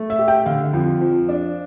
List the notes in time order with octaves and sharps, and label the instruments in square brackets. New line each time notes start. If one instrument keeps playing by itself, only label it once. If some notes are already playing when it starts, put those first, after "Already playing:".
Already playing: [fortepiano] A3
[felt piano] E5
[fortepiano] G4
[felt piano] G5
[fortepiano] D3 [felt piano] F5
[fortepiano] F2
F3
D4